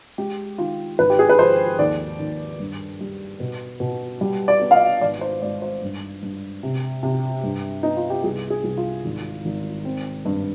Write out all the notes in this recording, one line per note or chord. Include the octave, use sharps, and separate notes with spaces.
G#3 G4
D#3 F4
G#1 B4
G4
G#4
B4
F3 C5
D#2 D5
D#2
G2
G3
B2
B2
G3
D5
B3
F5
D#5
G#1 D5
C5
G#2 D5
C5
G2
G2
C3
C3
G2
B3 D#4
F4
G4
C2 G#4
G#4
C2
F4
G#1
G#1
C4
G2